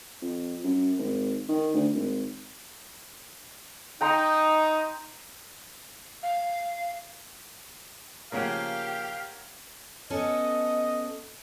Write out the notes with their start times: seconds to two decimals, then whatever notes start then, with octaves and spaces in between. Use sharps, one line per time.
0.22 F2
0.64 F#2
0.99 G#1
1.49 D#3
1.74 D2
1.94 G#1
4.01 D#4 G5 A#5 C6
6.23 F5
8.32 C#3 F3 A#3 G4 A#4 C#5 F5 F#5
10.10 B3 C#4 A4 D#5